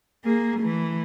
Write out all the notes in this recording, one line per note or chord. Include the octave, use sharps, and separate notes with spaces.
A#3 G#4
E3 A3